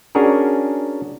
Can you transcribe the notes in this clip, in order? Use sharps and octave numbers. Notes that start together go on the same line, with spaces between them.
C#4 D4 F#4 G#4 A#4